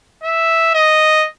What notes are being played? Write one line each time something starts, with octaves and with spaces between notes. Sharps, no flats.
E5
D#5